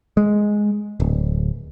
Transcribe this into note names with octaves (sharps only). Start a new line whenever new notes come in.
G#3
D1